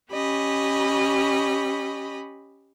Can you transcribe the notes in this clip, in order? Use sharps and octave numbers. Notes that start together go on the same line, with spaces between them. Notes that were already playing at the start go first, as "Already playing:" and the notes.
C#4 G4 D#5 B5